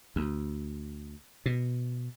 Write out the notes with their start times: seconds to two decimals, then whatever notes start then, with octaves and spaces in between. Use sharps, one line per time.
0.16 D2
1.46 B2